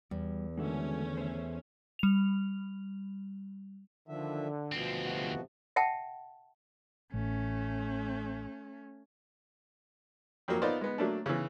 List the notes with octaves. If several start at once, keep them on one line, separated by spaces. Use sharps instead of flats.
E2 G3
D3 D#3 G#3 A3 C#4 F#4 E5
C5 E5
G3 F7
D3 D#3 F3 E5
D2 B2 F3 B3 C4
G1 C3 F#4
E5 F#5 G5 A5
A1 A3 C#4
F2 F#3 A#3
B3 D#4 F4 A#4 C5 D5
G#3 B3
F#3 A3 A#3 D4
C#3 E3